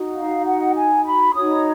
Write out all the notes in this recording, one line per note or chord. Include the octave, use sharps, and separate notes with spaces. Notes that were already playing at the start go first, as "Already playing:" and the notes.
Already playing: D#4 F#4
F5
F#5
G#5
B5
D#4 F#4 C#5 D#6